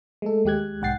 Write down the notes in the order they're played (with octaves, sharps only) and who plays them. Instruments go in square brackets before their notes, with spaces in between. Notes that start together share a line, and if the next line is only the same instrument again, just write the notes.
[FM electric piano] G#3 A3 A4
D#2 G#3 G4 F#6 G#6
B1 G#2 F#5 G5 A6 C7